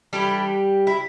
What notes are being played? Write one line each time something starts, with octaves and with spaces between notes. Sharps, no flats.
E3 G3 A3 D4 G4
E4